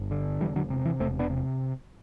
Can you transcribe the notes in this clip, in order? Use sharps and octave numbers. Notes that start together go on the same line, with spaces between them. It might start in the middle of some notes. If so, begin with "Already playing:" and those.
Already playing: G1
D3
E1 E3 G3
D3 F#3
C3
E3
E1 A3 C4
B3 D4
C3